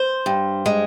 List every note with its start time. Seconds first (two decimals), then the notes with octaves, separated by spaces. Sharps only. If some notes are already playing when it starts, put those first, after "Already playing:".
Already playing: C5
0.26 G2
0.66 G#3